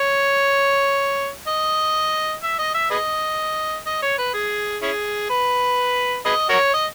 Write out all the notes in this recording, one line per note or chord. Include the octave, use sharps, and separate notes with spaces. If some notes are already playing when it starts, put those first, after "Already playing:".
Already playing: C#5
D#5
E5
D#5
E5
G#4 B4 D#5
D#5
C#5
B4
G#4
C#4 E4 G#4
B4
G#4 B4 D#5
F#4 A#4 C#5
D#5